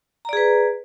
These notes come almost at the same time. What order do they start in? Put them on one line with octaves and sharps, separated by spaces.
A#5 D5 G#4 B4